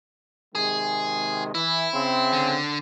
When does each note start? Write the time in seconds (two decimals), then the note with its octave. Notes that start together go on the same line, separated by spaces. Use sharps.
0.55 C3 D#3 G#3 G#4
1.55 E3 E4
1.94 C#3 C4
2.33 D3